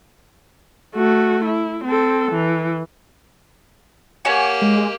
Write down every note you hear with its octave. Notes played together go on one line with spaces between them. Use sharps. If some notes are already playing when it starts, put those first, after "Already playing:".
A3 F#4
E4
C4 A4
E3
A#3 G4 C#5 F#5 G#5
G#3